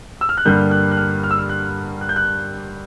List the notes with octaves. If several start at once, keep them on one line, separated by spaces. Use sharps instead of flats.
E6
F6
F#6
G2 D3 G3 A#3 G6
F#6
F#6
F6
F6
E6
F6
F#6
F#6
G6
F#6